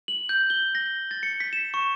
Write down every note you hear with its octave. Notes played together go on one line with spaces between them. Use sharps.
F#7
G6
G7
A#6
A6
C#7
B6
E7
C#6